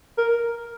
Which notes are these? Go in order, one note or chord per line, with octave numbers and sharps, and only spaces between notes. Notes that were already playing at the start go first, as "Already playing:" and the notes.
A#4